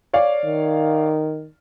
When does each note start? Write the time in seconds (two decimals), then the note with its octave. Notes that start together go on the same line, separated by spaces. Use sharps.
0.13 C#5 D5 F5
0.45 D#3